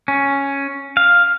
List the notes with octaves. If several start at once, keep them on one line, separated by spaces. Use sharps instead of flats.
C#4
F5